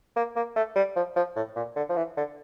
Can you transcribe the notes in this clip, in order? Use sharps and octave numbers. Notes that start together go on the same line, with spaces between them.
A#3
A#3
A3
G3
F3
F3
A2
A#2
D3
F3
E3
D3